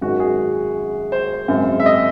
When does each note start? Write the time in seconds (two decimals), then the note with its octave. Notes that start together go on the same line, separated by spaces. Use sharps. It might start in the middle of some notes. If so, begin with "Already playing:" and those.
0.01 G#1 F#2 D#3 G#3 C#4 F#4
0.20 G#4
1.12 C5
1.48 G#1 F#2 C#3 G#3 C4
1.80 E5
1.86 D#5